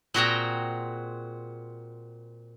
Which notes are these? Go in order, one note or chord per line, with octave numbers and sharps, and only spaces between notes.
A#2 C4 F#4 G#4 G5 A#5